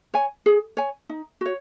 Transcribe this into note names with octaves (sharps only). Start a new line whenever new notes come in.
C#5 G#5
G#4
C#5 G#5
D#4
F#4 C#5